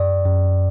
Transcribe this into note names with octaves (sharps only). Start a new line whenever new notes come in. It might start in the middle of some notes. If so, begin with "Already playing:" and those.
Already playing: F#2 D5
F#2